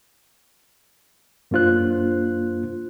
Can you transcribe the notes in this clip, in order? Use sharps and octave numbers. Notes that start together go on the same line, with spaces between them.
F#2 A#3 D4 F4 C5 F#6